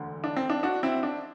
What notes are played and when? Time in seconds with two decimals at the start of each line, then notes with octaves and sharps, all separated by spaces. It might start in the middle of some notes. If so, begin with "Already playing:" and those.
Already playing: E1 D2 D3
0.24 D4
0.36 C4
0.50 D4
0.63 D4 F#4
0.83 C4 E4
1.03 D4